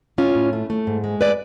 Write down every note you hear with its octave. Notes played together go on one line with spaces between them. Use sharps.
A2 C#4 F4
A2
A3
A3
G#2
G#3
B4 D5